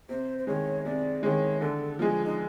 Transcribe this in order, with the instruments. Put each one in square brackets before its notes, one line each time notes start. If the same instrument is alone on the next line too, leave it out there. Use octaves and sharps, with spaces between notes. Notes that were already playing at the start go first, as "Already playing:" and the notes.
[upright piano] C3 [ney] C5
[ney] C5
[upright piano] D#3 G#3 [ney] C#5
[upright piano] C3 [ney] D5
[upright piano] D#3 G#3 [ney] C#5
[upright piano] D3 [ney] A4
[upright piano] F3 G#3 [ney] G#4
[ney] D#4